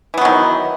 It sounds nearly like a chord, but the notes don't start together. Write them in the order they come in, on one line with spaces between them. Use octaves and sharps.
E3 B3 F#3 D#3